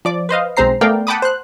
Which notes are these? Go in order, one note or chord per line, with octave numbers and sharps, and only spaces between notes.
F3 D5 D6
B4 C5 D#5 F5
B1 G#3 C4 C5 A#5 C7
A3 B3 A#4 D5 F5 G5
F#5 G5 A5 B5 D6 D#6
C5 F#6